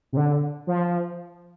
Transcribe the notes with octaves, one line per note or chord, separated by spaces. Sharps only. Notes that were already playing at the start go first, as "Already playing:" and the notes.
C3
D3
F3